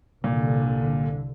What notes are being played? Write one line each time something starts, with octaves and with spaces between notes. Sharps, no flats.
C2 A#2 D3